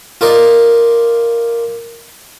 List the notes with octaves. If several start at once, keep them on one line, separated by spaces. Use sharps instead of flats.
F4 A#4 D5 D#5